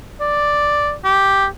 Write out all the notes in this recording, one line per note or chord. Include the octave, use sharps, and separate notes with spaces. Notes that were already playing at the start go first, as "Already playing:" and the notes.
D5
G4